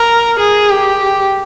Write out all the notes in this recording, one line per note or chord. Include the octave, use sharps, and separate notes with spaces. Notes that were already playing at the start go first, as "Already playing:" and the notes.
Already playing: A#4
G#4
G4